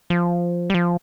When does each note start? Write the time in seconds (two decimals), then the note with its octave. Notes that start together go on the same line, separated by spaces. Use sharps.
0.10 F3
0.70 G3
0.74 F3